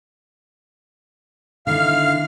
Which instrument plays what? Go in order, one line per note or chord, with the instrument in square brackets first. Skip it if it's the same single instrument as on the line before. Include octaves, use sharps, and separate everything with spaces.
[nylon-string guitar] D3 D#3 E4 [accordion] F5 F6